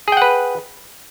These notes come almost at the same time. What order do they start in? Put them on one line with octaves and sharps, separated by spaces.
G#4 G5 F#5 B4